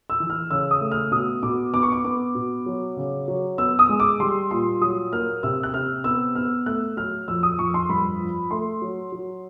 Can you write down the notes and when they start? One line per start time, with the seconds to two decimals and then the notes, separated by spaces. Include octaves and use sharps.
0.10 E6
0.20 E3
0.30 F6
0.51 C#3 E6
0.71 D#6
0.81 A3
0.91 F6
1.12 B2 D#6
1.43 B2 D6
1.74 B3 D6
1.83 C#6
1.92 D6
2.04 B3 D6
2.35 B2
2.66 F#3
2.97 C#3
3.28 F#3
3.58 B3 E6
3.79 D#6
3.89 G#3
4.00 D6
4.20 G3 C6
4.51 A#2 C6
4.82 F#3 D#6
5.12 A#3 F6
5.43 C3 E6
5.63 F#6
5.74 C3 F6
6.04 B3 E6
6.35 B3 F6
6.66 A3 F#6
6.97 F#3 F6
7.28 F2 E6
7.43 D#6
7.59 F2 C#6
7.74 C6
7.89 G2 B5
8.20 F3
8.51 A3 C6
8.82 F#3
9.12 F#3